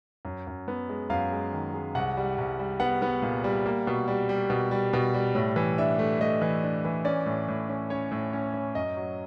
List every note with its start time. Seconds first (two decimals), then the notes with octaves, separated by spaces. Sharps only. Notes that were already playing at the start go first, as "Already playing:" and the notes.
0.25 F#2
0.47 F#2
0.68 B3
0.89 G#3
1.10 F#2 F5
1.32 G#3
1.53 D#3
1.74 G#3
1.95 C2 F#5
2.17 G3
2.38 C2
2.59 G3
2.80 B3 F#5
3.02 B3
3.22 A#2
3.44 G3
3.66 A#3
3.87 B2
4.08 G3
4.29 G3
4.50 B2
4.71 G3
4.93 B2
5.14 G3
5.35 A2
5.56 E3
5.78 D4 E5
5.99 A3
6.20 A3 D#5
6.42 E3
6.63 D4
6.85 E3
7.05 C#4 D5
7.26 A2
7.48 A2
7.69 C#4
7.90 C#4 C#5
8.11 A2
8.33 C#4
8.54 C#4
8.75 F#2 D#5
8.97 F#3